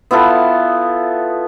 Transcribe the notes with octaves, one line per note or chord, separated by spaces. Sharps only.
B3 E4 F4 A4